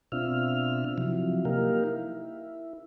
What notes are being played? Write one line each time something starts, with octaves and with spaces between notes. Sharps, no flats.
B2 C4 D4 F4 E5 F6
C3 F3 F#3 E4
A#3 D#4 G4 A#4 F5
E4